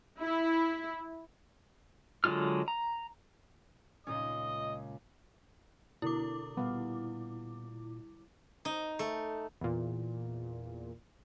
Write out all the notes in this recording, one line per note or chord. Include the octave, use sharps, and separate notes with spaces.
E4
D3 F#3 G#3 F4 F6
A#5
C#2 A#2 C#4 D#5 D#6
B2 D3 E4 A#4 D6
A#2 G3 B3 F5
D#4
A3
E2 A#2